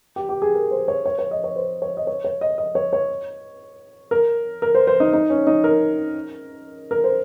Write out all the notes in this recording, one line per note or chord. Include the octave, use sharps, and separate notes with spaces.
G4
G4
G#4
A#4
C5
C#5
C#5
C#5
D#5
C#5
C5
C#5
D#5
C#5
C#5
D#5
D#5
C#5
C#5
A#4
A#4
C5
C5
D#4
D#4
C#4
D#4
A#4
A#4
C5